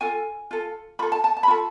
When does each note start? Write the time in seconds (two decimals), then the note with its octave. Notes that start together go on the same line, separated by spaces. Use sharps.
0.01 F4 A4 G#5
0.51 F4 A4
0.99 F4 A4 B5
1.12 A5
1.24 A5
1.37 A5
1.43 B5
1.48 F4 A4 A5